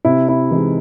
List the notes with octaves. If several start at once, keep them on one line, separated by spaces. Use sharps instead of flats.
C3 E4
E4
E3 G#3 D#4